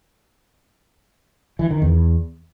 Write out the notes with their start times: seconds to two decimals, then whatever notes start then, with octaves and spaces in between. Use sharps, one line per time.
1.59 E3
1.71 D#3
1.82 E2